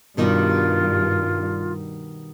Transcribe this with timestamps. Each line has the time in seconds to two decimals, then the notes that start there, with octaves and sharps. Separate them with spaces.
0.17 G2 B2 D#3 G3 F4